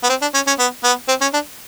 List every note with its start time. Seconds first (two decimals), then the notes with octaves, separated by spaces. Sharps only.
0.04 B3
0.09 C4
0.22 D4
0.34 C#4
0.47 C#4
0.59 B3
0.84 B3
1.08 C4
1.21 C#4
1.33 D4